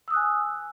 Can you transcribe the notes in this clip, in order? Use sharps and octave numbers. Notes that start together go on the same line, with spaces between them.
G#5 D#6 E6 F#6